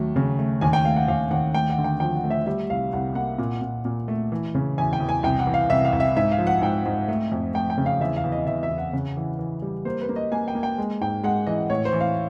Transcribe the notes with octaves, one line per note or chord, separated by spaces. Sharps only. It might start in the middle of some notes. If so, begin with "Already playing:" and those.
Already playing: D#2 F#3 A3
C#3
A3
D#2 G#5
G5
A3 F5
F#5
D#2 F5
D#2 F#5
A3 G5
F#5
D3
G5
F3 G5
F#5
A3
E5
G3 E5
C2 F5
C2 F#5
A#3 F#5
A#2
A#2
A#2
A3
E3
C#3
E2 G#5
G5
E2
G#5
C2 G5
F#5
E3
F5
C2 E5
F5
C2
E5
G#2 E5
F5
F3
F#5
G#2 G5
G#2
A3
F2
A3 G5
G5
C#3
F5
E2 E5
F5
E2
D#5
E2 E5
E5
E2
F#5
C#3
E3
E3
G3
A#3 C5
B4
A#3
D#5
A#3 G#5
G5
A#3
G5
G#3
G#2 G5
G#3 F#5
E3 D#5
A2 C#5
C5
E3
F5